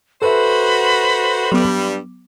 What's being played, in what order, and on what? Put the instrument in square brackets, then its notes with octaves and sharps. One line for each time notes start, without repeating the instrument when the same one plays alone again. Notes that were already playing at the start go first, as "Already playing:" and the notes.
[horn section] F#4 C5 [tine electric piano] A4 B4 E5 [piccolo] B5
[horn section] G2 G3 [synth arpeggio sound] F#3 B3 D6